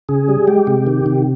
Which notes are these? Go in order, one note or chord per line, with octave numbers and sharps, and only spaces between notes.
C#3 G#4
G3
G#3 G4
C3
D#3
C3